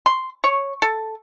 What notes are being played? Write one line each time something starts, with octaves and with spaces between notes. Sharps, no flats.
C6
C#5
A4